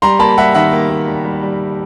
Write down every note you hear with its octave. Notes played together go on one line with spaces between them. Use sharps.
G3 A#5 C6
A#3 A5 B5
G3 E5 F#5
D#3 E5 F#5
A#3
A#3
G3
G3
G3